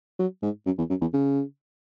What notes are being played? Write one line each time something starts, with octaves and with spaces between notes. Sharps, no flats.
F#3
G#2
F#2
E2
F#2
E2
C#3